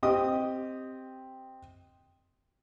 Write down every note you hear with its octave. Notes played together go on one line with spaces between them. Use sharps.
C4 G4 D#5 D#6